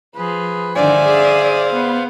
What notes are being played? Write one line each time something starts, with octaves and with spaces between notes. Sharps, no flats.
F3 G#4 B4
G2 D3 D#3 C5 D5 E5 F5 G#5
G#4
B3 B4